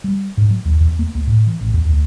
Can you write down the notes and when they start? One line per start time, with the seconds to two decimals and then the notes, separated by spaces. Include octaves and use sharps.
0.04 G3
0.37 G#2
0.50 F#3
0.65 D#2
0.80 E2
0.99 A#3
1.15 C#2
1.27 A2
1.47 E3
1.61 A1
1.74 E2
1.89 D2